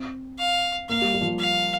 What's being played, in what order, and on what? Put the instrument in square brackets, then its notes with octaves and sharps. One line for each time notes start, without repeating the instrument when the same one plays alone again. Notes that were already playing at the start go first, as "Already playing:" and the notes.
Already playing: [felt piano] C4
[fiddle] F5
[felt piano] A#3 [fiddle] F5
[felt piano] G3
G3
F3
G3
[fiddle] F5